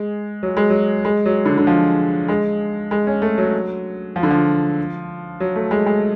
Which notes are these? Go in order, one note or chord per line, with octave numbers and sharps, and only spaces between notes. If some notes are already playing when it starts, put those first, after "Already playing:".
Already playing: G#3
F#3
G#3
F#3
G#3
F#3
D3
D3
F3
G#3
G#3
C#4
A3
F#3
F3
D3
F3
F#3
A3
G#3
G#3